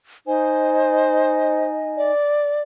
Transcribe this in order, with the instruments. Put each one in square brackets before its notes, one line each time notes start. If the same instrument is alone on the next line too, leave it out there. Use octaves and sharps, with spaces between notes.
[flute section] D#4 D#5 G#5 [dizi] C5
[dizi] D5